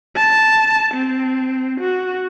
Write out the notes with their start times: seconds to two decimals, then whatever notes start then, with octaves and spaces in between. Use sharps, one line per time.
0.16 A5
0.94 C4
1.80 F#4